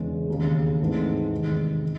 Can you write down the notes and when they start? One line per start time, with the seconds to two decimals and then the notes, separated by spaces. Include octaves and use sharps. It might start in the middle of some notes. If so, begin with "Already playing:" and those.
Already playing: E1 E2 C#3 G#3 C#4
0.29 E1 D#2 C#3
0.80 G#1 G#2 E3 A3
1.31 E1 E2 C3 D#3 G#3
1.83 C#3 D#4